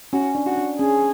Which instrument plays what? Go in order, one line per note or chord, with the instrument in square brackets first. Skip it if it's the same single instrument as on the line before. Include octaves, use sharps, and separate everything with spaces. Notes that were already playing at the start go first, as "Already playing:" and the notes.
[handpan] C#4 [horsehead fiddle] F#4
[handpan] D4
[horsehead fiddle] F#4
[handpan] D4
[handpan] C#4 [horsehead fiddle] G#4